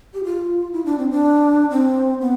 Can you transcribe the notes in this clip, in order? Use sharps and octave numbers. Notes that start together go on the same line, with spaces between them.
G4
F4
E4
D4
C4
D4
C4
B3